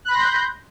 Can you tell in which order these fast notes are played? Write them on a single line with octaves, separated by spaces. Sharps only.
F#6 B5 A#6 C6 G6